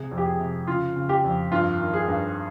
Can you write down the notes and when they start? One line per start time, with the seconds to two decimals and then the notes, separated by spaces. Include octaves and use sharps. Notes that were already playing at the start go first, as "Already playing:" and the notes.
Already playing: C3 G#4
0.11 F2
0.18 G4
0.26 G#4
0.40 C3
0.67 C#3 F4
0.96 C#3
1.09 G4
1.24 F2
1.51 G2 F4
1.80 D#3
1.94 G#4
2.08 G2